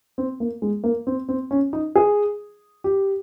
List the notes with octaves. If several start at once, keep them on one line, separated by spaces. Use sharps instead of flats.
C4
A#3
G#3
A#3
C4
C4
C#4
D#4
G#4
G4